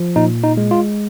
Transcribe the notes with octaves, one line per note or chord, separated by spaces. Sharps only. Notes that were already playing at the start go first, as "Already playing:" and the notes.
Already playing: F3
A#2 D#4
D#4
G#3
F4